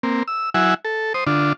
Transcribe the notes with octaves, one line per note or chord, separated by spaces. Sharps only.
A#3 C4
E6
F#3 E4 E5 F#5 G#5
A4
C5 D#6
D3 D4 F4